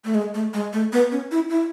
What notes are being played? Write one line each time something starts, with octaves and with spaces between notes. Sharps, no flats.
A3
G#3
A3
G#3
A3
B3
C#4
E4
E4